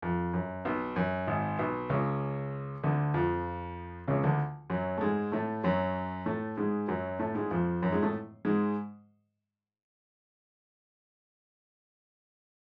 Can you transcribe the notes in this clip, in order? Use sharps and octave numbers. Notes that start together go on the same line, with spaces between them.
F2
F#2
B1 B2
F#2
G#1 G#2
B1 B2
C#2 C#3
D2 D3
F2 F3
C#2 C#3
D2 D3
F#2 F#3
A3
G#2 G#3
A2 A3
F#2 F#3
A2 A3
G#2 G#3
F#2 F#3
A2 A3
G#2 G#3
F2 F3
F#2 F#3
G#2 G#3
A2 A3
G#2 G#3